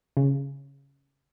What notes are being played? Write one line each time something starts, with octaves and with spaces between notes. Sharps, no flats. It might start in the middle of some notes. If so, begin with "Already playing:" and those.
C#3